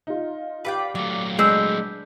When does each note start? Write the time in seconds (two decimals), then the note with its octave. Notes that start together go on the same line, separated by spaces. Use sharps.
0.07 D#4 F4
0.65 G4 B4 D5 F5 G5
0.95 F#3 A3 D5
1.39 G#3 D4 B4 E6 G6